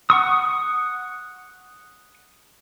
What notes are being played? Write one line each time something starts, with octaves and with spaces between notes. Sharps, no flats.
F#5 C#6 D#6